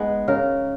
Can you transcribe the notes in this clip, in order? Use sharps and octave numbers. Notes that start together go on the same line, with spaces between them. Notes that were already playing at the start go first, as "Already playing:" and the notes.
Already playing: G#3 B3 D#4
C#3 A#4